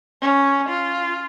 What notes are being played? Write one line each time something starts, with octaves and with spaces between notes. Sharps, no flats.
C#4
F4